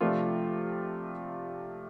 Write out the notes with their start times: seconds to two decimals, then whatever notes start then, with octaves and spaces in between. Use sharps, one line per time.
0.01 C3 F3 A3 D4 F4